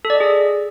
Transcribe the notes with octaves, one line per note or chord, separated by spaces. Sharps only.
A4
D5
D#5
G#4